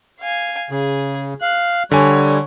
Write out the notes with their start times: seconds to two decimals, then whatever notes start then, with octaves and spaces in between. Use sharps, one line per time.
0.20 F5 G#5
0.71 C#3 G#4
1.42 F5 F#6
1.91 D3 G3 C#5 G#5